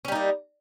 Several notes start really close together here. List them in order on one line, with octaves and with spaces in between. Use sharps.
C#4 G3 D#4 A#3